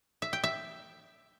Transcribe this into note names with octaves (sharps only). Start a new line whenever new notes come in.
E5
G5
E5